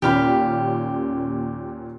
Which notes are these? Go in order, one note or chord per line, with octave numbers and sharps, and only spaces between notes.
D#2 A#2 C#4 G4 F5 B5